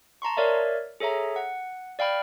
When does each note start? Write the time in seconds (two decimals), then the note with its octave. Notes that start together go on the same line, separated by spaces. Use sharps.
0.22 A5 A#5 C6 C#6
0.37 A#4 C#5 D5 E5 F5
1.00 G#4 A4 C#5 E5 A#5
1.36 F#5
1.99 D5 F5 G5 B5 F6